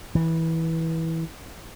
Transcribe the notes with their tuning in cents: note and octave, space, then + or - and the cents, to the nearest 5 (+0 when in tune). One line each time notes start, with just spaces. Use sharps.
E3 -20